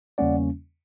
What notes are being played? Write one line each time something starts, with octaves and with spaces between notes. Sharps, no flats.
E2 C#3 G3 A#3 C#4 D5 F#5